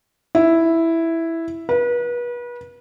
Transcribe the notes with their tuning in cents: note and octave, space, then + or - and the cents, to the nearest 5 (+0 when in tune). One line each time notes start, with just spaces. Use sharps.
E4 +0
B4 -35